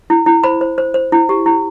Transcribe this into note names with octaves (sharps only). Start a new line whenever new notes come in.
E4
E4
C5 B5
C5
C5
C5
E4
G4
E4